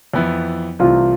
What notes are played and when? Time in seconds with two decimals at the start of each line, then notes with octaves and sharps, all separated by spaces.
0.14 F2 E3 B3 E4
0.79 C2 C3 E3 A3 C4 F4